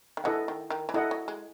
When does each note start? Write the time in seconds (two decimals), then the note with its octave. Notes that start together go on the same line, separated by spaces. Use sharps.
0.17 D#3
0.24 E3 E4 A4 D#5 F#5
0.48 D#3
0.70 D#3
0.89 E3
0.94 F#3 E4 A4 D#5 F#5
1.11 F#3
1.28 G#3